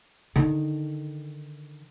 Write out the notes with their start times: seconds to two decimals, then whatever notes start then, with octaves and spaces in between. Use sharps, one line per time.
0.36 D3 D#3